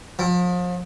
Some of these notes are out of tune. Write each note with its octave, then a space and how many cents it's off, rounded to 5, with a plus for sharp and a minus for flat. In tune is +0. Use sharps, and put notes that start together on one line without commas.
F3 +35